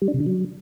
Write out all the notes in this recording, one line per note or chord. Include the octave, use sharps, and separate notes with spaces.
G3
D4
C3
D3
F#3